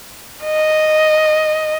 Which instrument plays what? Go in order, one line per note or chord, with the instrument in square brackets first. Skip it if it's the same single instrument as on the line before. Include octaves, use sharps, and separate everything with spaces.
[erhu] D#5